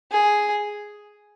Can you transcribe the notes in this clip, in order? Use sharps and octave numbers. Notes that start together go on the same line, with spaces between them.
G#4